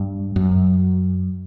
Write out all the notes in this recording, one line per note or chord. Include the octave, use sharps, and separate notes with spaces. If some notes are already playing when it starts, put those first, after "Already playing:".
Already playing: G2
F#2